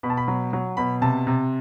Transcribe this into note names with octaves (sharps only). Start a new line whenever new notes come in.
B2 B5
A5
B5
F#3
F#3
B2 B5
C3 A5
C3